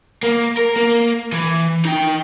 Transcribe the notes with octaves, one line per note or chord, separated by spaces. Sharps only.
A#3
A#4
A#3
E3
D#4 G5